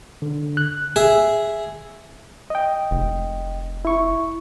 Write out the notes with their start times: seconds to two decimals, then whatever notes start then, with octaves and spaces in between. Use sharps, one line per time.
0.22 D3
0.57 F#6
0.96 G#4 E5
2.50 D#5 G5
2.91 F1
3.85 E4 C#6